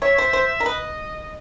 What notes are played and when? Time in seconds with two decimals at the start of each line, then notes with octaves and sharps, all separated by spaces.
0.01 C#5 E5
0.18 C5
0.33 C5
0.60 A#4
0.66 B4 D#5